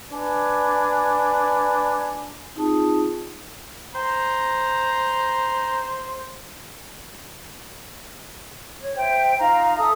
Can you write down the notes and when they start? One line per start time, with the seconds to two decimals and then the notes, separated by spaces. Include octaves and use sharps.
0.12 D4 B4 G#5
2.55 C4 D#4 F4 G#4 A5 D#6
3.95 C5 A#5
8.80 C#5
8.96 C5 E5 G5
9.39 D#4 F4 F5 A#5
9.77 A4 E5 D#6